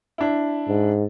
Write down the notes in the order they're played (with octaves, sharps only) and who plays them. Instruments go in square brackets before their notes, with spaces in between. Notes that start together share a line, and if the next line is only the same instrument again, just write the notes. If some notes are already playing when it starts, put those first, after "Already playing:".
[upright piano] D4 E4
[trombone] G#2